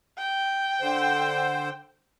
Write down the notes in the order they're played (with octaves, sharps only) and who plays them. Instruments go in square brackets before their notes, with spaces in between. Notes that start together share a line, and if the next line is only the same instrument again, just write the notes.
[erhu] G5
[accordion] D3 C5